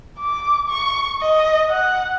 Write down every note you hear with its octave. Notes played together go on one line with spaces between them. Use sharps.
D6
C#6
D#5
F#5